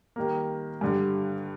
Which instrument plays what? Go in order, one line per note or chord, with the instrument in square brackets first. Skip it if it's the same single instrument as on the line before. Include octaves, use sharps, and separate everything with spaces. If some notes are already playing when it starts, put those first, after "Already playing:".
[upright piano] D#3 G3 A#3
G2 D3 G3